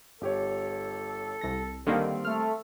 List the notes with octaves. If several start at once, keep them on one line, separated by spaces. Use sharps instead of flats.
G1 G4 A4 C#5
C2 A#6
D3 D#3 G3 A#3 C4
A3 F6